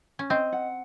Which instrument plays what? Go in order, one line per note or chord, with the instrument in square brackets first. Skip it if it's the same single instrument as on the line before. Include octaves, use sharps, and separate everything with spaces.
[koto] C#4
[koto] C4 [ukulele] D#5
[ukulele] F#5